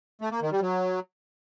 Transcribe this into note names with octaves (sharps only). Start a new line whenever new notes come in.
A3
A#3
D#3
G3
F#3